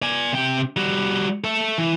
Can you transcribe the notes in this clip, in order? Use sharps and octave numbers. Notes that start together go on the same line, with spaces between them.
D5 G#5
C3 G5
G3 F#4
A4 E5
E3